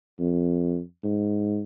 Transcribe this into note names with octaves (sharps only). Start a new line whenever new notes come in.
F2
G#2